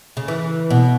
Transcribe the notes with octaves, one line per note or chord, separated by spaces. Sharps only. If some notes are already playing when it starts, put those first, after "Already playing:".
C#3
E3
B2